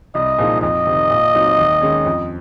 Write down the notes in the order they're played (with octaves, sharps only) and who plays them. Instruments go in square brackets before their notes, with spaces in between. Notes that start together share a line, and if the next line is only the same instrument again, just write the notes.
[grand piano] C2 [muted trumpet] D#5
[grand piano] A#2 F3 G#3 D#4
[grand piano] F2 [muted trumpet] D#5
[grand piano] C3 D#3
A#2
F#3 C4 D#4
D#2
D#3 G#3 C#4
F2